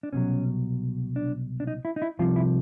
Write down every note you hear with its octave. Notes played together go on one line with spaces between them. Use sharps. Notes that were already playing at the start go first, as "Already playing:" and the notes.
D4
C2 B2 F#3 C#4
D4
D4
D#4
E4
D#4
E4
C2 C3 F3 F4
E4